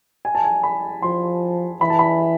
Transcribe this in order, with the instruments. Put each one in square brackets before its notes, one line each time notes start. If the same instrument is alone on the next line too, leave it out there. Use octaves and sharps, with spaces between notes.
[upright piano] G#5
A5
G#5
B5
[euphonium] F3 [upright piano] C6
[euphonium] E3 [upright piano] B5
[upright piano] A5
B5